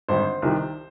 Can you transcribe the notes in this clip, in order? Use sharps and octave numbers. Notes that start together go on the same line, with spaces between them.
G#1 G2 D3 C5
C2 C3 D#3